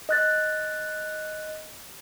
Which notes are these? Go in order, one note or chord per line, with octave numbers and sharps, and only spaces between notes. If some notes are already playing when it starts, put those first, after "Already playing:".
D#5 F#6 A6